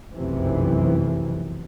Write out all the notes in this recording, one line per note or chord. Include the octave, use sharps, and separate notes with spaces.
F1 B1 F#2 C3 E3